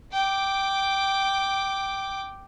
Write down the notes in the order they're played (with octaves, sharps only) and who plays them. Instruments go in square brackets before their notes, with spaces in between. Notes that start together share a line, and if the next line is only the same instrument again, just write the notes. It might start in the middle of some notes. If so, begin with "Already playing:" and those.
[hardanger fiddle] G5 D6